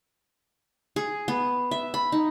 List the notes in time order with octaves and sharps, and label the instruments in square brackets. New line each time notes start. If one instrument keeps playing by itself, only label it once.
[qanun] G#4
B3
E5
B5
D#4